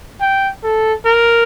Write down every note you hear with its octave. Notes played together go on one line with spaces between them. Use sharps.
G5
A4
A#4